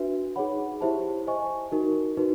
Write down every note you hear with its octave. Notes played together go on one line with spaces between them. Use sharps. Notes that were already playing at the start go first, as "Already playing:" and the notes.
Already playing: D4 F#4 B4 E5
D#4 G#4 C#5 F#5 B5
E4 G4 C5 E5 A5
C5 D#5 G#5 C#6
D#4 F#4 A#4
D#4 F#4 B4